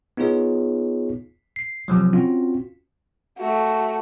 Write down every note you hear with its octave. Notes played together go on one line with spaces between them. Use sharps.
B3 D#4 F4 G#4 C#5
C7
C3 F3 F#3
C4 C#4 F4 F#4
A3 F#4